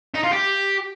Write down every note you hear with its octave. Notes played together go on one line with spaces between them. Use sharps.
D#4
F4
G4